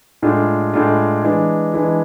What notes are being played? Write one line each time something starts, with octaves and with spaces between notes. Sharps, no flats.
A2 G#3 D4 F4
A2 G#3 D4 F4
E3 G#3 D4
E3 G#3 D4